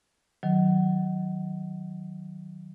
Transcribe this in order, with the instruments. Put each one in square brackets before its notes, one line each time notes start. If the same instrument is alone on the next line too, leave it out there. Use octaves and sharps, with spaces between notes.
[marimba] D#3 F#3